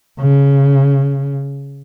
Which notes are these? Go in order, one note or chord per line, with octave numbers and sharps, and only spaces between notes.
C#3